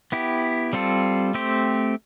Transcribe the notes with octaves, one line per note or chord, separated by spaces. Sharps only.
B3 E4 G4
G3 C4 F4 A4
A3 C4 G4 C5